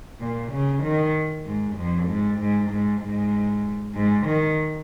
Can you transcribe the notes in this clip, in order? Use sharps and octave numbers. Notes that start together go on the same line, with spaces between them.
A#2
C#3
D#3
G#2
F2
G#2
G#2
G#2
G#2
G#2
D#3